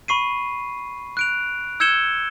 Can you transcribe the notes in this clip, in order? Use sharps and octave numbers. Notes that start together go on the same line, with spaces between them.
B5 C#6 C7 D#7
F#6 D7 F7
E6 G6 G#6 C#7 E7 G7